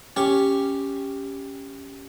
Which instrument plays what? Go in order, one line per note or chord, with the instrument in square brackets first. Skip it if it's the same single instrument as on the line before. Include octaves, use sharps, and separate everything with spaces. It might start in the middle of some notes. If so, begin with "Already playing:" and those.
[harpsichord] C#4 G4 C#6